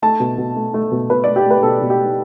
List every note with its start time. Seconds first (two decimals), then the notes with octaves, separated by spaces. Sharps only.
0.02 A3 A5
0.20 B2
0.38 B2
0.56 A3
0.74 A3
0.91 B2
1.10 B2 B4
1.24 A3 D5
1.36 G4
1.46 A3 B4
1.63 B2 A4
1.82 B2
1.90 G4
1.99 A3